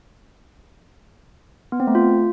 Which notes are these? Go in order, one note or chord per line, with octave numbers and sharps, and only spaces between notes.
B3
C4
A3
F4